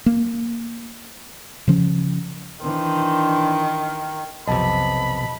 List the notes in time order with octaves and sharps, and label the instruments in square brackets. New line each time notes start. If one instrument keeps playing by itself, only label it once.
[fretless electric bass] A#3
C#3 F3 C#4
[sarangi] D#3 [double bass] E3 D4 [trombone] C5
[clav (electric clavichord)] B1 F2 C3 [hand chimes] D#5 A5 [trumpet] B5